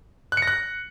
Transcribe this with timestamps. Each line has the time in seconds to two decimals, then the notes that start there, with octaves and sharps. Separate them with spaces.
0.32 F#6
0.37 C#7
0.42 A#6
0.47 F#6